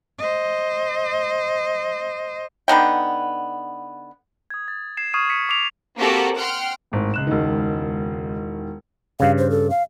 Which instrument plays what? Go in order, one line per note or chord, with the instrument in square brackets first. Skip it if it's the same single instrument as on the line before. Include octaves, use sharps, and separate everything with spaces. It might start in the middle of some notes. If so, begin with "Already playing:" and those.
[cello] C5 D#5
[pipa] D3 B3 D#4 G5
[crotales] D#6 G#6
A6
G#6 C7 E7
C#6 D#6 F6 G#6 C7 D#7
B6 C#7 D#7
D6 C7 D7 F7
[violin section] A#3 C4 F#4 G4 A4 A#4
F#5 G5 C6 F6
[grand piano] G#1 A2
C#2 F#6 E7
[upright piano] E1 D#3
[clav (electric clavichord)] G2 C#3 [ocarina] F5
[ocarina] C5
A4
F5